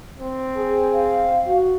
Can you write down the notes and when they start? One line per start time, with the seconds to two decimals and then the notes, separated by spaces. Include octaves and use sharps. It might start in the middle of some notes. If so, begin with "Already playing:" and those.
0.18 C4
0.56 G#4
0.94 F5
1.47 F#4